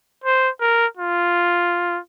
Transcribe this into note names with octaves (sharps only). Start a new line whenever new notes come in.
C5
A#4
F4